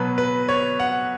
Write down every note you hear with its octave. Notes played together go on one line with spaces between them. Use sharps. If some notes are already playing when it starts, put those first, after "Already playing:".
Already playing: B2 F#3 B4
B4
C#5
F#5